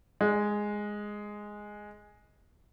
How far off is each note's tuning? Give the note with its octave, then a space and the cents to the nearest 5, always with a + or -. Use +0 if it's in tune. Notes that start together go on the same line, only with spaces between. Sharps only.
G#3 +0